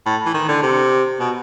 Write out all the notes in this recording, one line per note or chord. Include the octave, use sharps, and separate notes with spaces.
A2
E3
D#3
D3
C3
B2